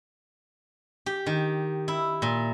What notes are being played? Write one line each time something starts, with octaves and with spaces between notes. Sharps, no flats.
G4
D#3
E4
A#2